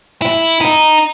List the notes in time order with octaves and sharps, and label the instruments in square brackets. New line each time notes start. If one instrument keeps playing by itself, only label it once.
[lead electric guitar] E4
D#4